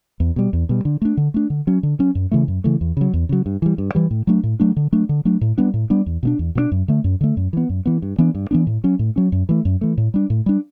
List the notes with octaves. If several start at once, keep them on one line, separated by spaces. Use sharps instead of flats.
E2
B2 G3
E2
B2 G3
D3
A3 D4
D3
A3 D4
D3
F#3 C#4
D3
F#3 C#4
F#2
C#3 E3 A3
F#2
C#3 E3 A3
E2
C#3 F#3
E2
C#3 F#3
G2
E3 G3
G2
E3 G3
A2
F#3 A3 D4
A2
F#3 A3 D4
D3
F#3 A3 D4
D3
F#3 A3 D4
A2
G3 B3 D4
A2
G3 B3 D4
E2
B2 A3 D4
E2
B2 A3 D4
F#2
D3 A3
F#2
D3 A3
F#2
E3 B3
F#2
E3 B3
G2
E3 B3 D4
G2
E3 B3 D4
A2
F#3 C#4
A2
F#3 C#4
F#2
E3 A3
F#2
E3 A3
A2
G3 D4
A2
G3 D4